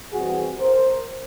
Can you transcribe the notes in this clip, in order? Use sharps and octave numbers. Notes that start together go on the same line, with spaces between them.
E3 G3 C4 F#4 G#4
A#4 C5